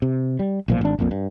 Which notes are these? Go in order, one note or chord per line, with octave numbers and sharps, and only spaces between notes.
C3
G3
B1 A#2 F3
G#1 D4
A#1 F2 A#2
G2